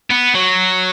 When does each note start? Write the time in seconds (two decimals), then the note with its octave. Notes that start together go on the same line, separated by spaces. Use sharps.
0.11 B3
0.35 F#3